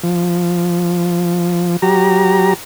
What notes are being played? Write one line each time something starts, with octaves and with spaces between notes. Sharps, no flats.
F3
F#3 G4 A#5